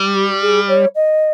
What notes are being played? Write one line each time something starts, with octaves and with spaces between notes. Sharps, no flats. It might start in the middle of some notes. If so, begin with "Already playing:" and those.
Already playing: G3
G4
G#4
C#5
D#5